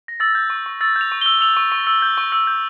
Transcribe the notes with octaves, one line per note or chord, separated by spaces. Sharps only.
A#6
E6 A6
G6
C#6
C#6
E6 A6
G6
F7
C#6
G7
E6
E6 F7
C#6
C#6
E6
G6
C#6
E6
G6